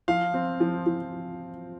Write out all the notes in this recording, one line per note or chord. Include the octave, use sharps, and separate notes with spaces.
F3 F5
C4
F3
F3